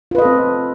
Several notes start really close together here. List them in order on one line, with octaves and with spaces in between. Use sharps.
F4 B4 D#5 A4 C4